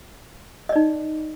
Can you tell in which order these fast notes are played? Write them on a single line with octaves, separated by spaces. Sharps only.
D#5 D5 D#4